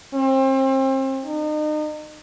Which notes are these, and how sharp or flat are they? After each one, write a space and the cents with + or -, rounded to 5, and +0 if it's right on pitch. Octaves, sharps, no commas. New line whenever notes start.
C4 +35
D#4 -35